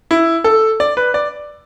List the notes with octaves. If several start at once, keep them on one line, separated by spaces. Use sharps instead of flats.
E4
A4
D5
B4
D5